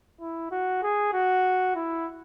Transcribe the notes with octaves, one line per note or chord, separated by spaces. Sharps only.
E4
F#4
G#4
F#4
E4